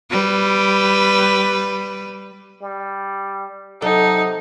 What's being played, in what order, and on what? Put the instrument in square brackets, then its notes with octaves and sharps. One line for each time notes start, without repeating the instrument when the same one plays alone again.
[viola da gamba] G3 B4
[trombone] G3
[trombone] C3 [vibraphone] F#3 F#5 [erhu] D#4 [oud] A4